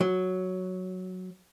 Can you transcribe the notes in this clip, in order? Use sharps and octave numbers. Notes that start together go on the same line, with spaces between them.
F#3